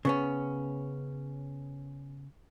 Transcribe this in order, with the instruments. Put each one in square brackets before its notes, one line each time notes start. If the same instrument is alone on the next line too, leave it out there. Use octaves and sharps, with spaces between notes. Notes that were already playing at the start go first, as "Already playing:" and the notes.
[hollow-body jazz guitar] C#3 B3 C#4